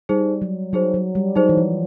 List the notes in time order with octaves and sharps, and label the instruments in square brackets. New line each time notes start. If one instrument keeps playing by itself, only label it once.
[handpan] G3 [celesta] D#4 G#4 C5
[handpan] F#3
[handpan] F#3 [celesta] D#4 G#4 C5
[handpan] F#3
G3
[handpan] F#3 [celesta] D#4 G#4 C5
[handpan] E3
F3